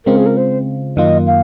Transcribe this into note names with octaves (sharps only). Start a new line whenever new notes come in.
C#3 G#3 C4 F4 A#4
G#4
A#4
C5
F#2 D#3 A#3 F4 D#5
F5